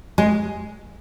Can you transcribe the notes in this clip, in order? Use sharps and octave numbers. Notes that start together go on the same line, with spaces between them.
G#3